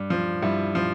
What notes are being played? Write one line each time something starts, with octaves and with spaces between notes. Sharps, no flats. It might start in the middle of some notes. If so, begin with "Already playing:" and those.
Already playing: G2
F3
G2 E4
F3